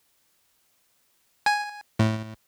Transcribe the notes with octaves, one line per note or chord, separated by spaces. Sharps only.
G#5
A2